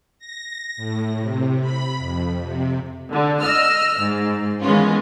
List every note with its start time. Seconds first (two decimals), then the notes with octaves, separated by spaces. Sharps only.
0.19 A#6
0.77 A2
1.20 C3
1.61 B5
1.98 F2
2.43 C3
3.11 D3
3.41 D#5 E6 F6
4.01 G#2
4.62 D#3 E3 G#3 B3 C#4 F4